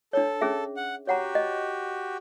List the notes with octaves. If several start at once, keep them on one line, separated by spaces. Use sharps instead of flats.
D4 A4 C#5
C#4 G#4 E5
F#5
F#4 G4 C#5 F#5 A#5
D#5